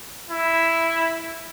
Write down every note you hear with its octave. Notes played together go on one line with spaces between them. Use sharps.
E4